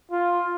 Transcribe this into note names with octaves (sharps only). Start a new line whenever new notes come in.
F4